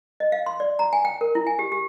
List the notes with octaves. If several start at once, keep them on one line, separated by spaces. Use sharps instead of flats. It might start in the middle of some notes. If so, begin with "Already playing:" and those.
D#5
F5
C6
D5
A#5
G#5
G5
A#4
E4
G#5
G4
G4